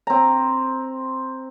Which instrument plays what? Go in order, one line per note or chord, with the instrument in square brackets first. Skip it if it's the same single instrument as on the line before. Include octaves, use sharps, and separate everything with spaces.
[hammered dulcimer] C4 A#5